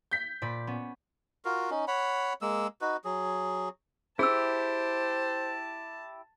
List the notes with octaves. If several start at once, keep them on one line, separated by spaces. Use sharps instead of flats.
G6 B6
A#2 D5 B5
B3 C#4
F4 F#4 A#4
C#4 D#4
C#5 F#5 B5
G#3 A#3 E6
D#4 F#4 B4
F#3 G#4
E4 G4 G#4 C5 A5 E6